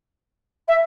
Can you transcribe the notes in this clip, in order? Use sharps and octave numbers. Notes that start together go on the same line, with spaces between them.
E5